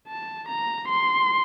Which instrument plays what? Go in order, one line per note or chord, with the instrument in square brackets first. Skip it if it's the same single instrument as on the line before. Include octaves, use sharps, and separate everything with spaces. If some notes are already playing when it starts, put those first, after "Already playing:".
[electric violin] A5
A#5
C6